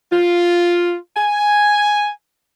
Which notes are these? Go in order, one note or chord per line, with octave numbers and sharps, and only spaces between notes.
F4
G#5